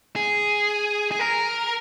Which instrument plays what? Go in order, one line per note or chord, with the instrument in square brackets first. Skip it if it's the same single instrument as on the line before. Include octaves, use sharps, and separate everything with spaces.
[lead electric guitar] G#4
G#4
A#4